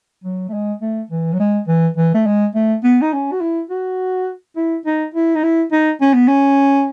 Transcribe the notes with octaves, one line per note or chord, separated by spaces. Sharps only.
F#3
A3
G#3
A3
E3
F#3
G#3
E3
E3
A3
G#3
A3
B3
D#4
C#4
F#4
E4
F#4
E4
D#4
E4
D#4
E4
D#4
C#4
B3
C#4